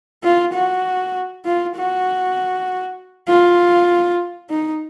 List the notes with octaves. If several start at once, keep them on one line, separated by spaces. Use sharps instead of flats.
F4
F#4
F4
F#4
F4
D#4